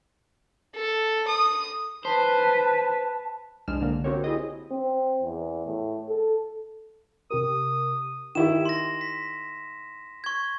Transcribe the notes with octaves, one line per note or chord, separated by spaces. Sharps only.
A4
D#6
B4 C5 A5
C2 G#3 D4 F6 E7
D3 A#3
C4 F#4 G4 A#4 C#5
E4 G#4 D#5
C4
E2
A2
A4
C3 G4 A#4 D#6
D#3 E4 G4 E7
C6 A#6
B6
C#6 G#6